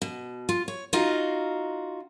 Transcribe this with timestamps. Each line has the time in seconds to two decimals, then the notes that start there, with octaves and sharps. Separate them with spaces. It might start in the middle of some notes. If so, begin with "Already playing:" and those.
0.02 B2
0.49 F4
0.68 C#5
0.93 D#4 F4 F#4 D#5 F5